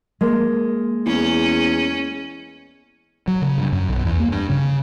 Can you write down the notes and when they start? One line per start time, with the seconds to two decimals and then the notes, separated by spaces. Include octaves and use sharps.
0.21 G#3 A#3
1.06 E2 C#4
3.28 F#3
3.42 C#3
3.58 G2
3.72 F#2
3.89 B1
4.05 E2
4.20 A#3
4.32 G2
4.50 C#3